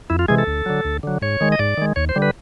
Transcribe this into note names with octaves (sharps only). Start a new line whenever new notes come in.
F2 E4
F4
C3 E3 G#3 G#4
A4
D2
D3 F#3
D2
D3 F#3
G#2 C#5
D#3 G#3
D#5
G#2 D5
D#3 G#3
D#2 C#5
C5
D3 G3
B4